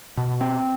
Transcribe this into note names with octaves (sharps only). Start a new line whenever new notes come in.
B2
C4